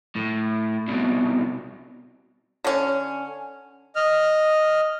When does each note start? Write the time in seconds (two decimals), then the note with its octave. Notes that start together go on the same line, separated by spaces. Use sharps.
0.16 A2
0.88 C2 B2
2.64 D3 C#4
3.96 D#5 F6